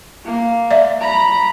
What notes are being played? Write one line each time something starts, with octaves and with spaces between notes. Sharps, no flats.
A#3
D5 E5
A#5 B5